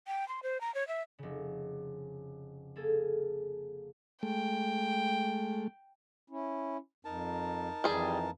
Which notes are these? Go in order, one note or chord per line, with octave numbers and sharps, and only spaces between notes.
G5
C6
C5
A#5
C#5
E5
F1 C#3
A#3 G#4 A4
G#3 A3 G5
C#4 E4
F2 D#4 A#4 A5
F2 E3 G3 G#4